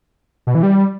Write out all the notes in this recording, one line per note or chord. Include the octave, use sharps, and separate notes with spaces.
B2
E3
G3